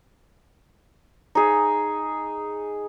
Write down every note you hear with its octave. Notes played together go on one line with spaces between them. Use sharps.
D#4 G#4